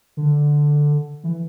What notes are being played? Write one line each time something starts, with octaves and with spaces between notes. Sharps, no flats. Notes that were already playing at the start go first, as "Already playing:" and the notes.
D3
E3